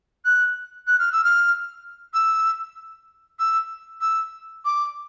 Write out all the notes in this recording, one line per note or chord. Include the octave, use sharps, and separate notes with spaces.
F#6
F#6
F6
E6
F6
E6
E6
E6
D6